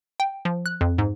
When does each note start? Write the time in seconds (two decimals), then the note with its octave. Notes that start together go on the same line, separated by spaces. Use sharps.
0.20 G5
0.45 F3
0.66 F#6
0.81 F2
0.98 G#2